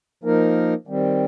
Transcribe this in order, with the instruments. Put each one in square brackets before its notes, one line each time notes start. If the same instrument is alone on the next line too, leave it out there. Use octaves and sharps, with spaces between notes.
[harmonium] F3 A#3 D#4 A#4
D#3 G3 C4